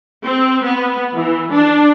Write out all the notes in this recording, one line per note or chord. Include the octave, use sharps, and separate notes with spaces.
C4
B3
E3
D4